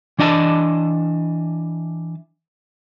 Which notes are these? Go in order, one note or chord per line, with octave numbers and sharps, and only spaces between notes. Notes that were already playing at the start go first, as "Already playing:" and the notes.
E3 D4 D#5 E5 A5